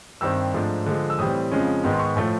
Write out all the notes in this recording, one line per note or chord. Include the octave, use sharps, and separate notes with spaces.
G2 D#3 G3 C4 E6
G#2 F3 A3 D4
D3 F3 G#3
E6
A2 E3 G3 C4 D#6
F2 C#3 F3 G#3 C#4
G#2 D#3 G#3 B3
C6
C#6
A2 F3 A3 C#6